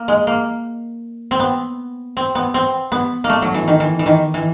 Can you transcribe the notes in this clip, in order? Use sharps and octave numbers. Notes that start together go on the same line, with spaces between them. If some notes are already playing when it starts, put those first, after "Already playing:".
Already playing: A#3
G#3
A#3
C4
B3
C4
B3
C4
B3
A#3
A3
F#3
E3
D#3
E3
E3
D#3
E3